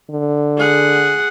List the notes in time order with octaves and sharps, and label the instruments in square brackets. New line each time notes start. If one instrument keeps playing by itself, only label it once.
[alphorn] D3
[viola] G#4 F#5